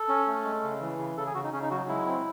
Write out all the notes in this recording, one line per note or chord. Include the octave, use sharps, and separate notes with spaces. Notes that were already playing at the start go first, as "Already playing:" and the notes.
Already playing: A4
C#4
A3
G#3
C#3
E3
C#3
C#3 A4
G#4
C#3 F#4
D#4
C#3 C#4
D#4
F#3 F#4
G#3 E4
C4